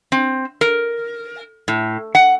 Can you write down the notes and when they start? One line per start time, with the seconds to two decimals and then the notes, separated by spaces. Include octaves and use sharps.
0.12 C4
0.61 A#4
1.68 A2
2.15 F#5